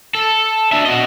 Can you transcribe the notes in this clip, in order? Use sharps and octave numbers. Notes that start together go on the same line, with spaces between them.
A4
D4 E5
F#4 D#5